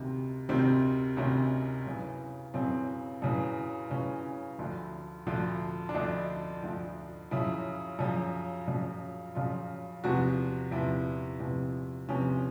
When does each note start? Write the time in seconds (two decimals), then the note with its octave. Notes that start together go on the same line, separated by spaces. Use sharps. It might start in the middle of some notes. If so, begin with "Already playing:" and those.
Already playing: D2 C3 D#3
0.49 D2 C3 D#3 C4
1.17 D2 C3 D#3 C#4
1.86 F#2 C#3 E3
2.54 F#2 C#3 E3 C4
3.22 F#2 C#3 E3
3.90 F#2 C#3 E3 C#4
4.59 D2 D3 F3
5.27 D2 D3 F3
5.89 D4
5.95 D2 D3 F3 D#4
6.63 D2 D3 F3
7.31 F#2 C#3 F3 E4
7.99 F#2 C#3 F3
8.68 F#2 C#3 F3
9.35 F#2 C#3 F3 F4
10.04 E2 C3 F3 F#4
10.71 E2 C3 F3 E4
11.40 E2 C3 F3
12.09 E2 C3 F3 C#4